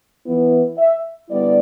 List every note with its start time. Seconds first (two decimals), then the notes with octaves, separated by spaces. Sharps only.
0.25 E3 B3 E4
0.77 E5
1.29 D3 G3 B3 E4 D5